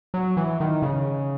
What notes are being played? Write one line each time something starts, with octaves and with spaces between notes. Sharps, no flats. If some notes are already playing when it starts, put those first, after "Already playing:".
F#3
E3
D#3
C#3